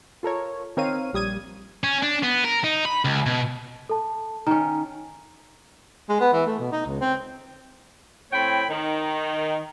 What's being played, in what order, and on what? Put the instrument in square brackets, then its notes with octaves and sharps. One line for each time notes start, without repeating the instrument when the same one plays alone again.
[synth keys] F4 A4 A#4 C#5
D#3 C4 A#4 C#5 F5 D#7
A#1 G3 D#6 G#6 D#7
[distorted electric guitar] C#4
D4
B3
A#4
D#4
B5
C#2
B2
[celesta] A4 A5
[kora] D#3 C#4 [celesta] A#5
[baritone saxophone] G#3
B3
E3
A3
B2
D#4
C#2
C4
[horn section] A2 C4 C#5 G5 B5
D#3